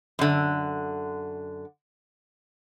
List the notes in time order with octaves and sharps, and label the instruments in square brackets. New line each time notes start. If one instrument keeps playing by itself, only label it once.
[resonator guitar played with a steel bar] F#2 D3